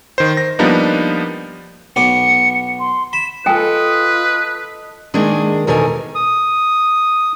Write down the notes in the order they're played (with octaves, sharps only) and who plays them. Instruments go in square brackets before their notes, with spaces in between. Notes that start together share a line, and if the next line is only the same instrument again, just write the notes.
[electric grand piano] D#3 C5
A#6
F3 G3 A#3 B3 D4 D#4
[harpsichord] B1 B3 D6 [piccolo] C#7
[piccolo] C6
[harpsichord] B5 [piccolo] E7
[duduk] F4 [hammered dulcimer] A4 D#5 [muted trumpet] B4 [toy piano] G5 G#5
[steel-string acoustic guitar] D#3 G#3 A#3 D4 G#4
E2 B2 D#3 A4 A#4 G#5
[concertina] D#6